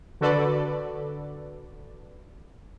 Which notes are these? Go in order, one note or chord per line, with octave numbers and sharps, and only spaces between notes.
D3 F#4 A4 B4 D5